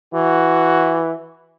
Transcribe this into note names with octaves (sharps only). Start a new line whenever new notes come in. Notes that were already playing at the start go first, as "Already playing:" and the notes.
E3 F#4